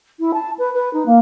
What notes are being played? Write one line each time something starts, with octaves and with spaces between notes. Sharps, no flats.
E4
A5
B4
B4
D#4
A#3